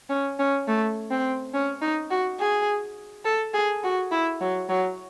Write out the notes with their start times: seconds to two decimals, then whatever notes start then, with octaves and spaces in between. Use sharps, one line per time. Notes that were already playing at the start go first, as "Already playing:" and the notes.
0.09 C#4
0.39 C#4
0.67 A3
1.10 C4
1.54 C#4
1.81 D#4
2.11 F#4
2.40 G#4
3.25 A4
3.54 G#4
3.84 F#4
4.12 E4
4.41 F#3
4.69 F#3